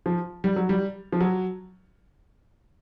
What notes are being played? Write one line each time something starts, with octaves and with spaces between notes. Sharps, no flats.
F3
G3
F#3
G3
F3
F#3